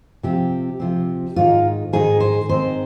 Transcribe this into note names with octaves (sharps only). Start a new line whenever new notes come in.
C3 F3 C4 G4
C3 F3 C4
G#2 D#3 G#3 D#4 F4
G#2 D#3 G#3 D#4 G#4
C5
G#2 D#3 G#3 C4 C5